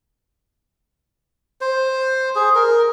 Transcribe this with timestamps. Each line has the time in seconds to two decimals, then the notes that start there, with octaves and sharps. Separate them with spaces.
1.61 C5
2.35 G#4
2.55 A#4